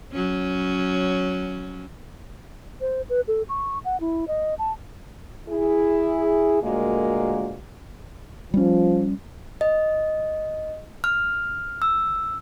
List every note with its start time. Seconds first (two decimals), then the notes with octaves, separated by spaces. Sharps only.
0.12 F#3 C#4
2.81 C5
3.09 B4
3.28 A4
3.49 C#6
3.85 F#5
4.00 E4
4.28 D#5
4.59 A5
5.49 E4 G#4
6.61 D2 A#2 G#3 A#3 F#4
8.54 F3 G3 C#4
9.61 D#5
11.04 F6
11.82 E6